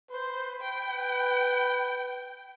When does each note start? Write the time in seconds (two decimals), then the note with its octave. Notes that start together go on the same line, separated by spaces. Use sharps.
0.11 B4 C5
0.61 G5